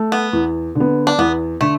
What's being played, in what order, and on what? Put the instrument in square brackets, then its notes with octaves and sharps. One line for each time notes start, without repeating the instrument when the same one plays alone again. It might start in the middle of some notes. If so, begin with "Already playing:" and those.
Already playing: [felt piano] A3
[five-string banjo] B3
[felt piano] E2
D3
B3
[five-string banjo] D4
[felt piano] E2 [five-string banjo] B3
[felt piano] D3 [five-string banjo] A3